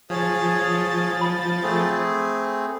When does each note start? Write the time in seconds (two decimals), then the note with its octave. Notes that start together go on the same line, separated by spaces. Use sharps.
0.10 F3 G#4 C#5 A6
1.21 B5
1.63 A3 C4 G#4